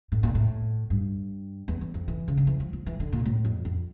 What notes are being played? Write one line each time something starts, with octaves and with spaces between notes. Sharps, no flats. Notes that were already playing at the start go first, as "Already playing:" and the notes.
A2
A#2
A2
G2
E2
E2
F2
E3
C#3
D3
E3
F3
F3
E3
D3
A#2
A2
F2
F2